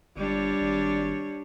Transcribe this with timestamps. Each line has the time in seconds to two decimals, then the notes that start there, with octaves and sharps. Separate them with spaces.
0.16 G1 G3 D4 C#5
0.61 G#1